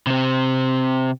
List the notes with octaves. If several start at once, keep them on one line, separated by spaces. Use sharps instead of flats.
C3 C4